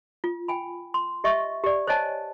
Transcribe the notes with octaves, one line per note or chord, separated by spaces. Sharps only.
F4
G5 G#5 B5
C6
G4 D#5 E5 C#6
G4 D5
C5 C#5 D#5 G#5 A5